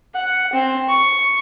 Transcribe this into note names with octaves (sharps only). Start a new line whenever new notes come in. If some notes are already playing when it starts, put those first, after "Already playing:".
F#5
C4
C#6